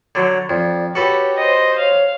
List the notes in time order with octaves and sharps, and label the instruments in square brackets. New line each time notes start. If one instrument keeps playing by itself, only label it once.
[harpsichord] D3 F#3
[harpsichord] F2 [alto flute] D5
[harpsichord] F#4 A4 B4 [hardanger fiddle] G4 [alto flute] C#5
[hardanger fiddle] C5 D#5
[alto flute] C#5 [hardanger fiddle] F5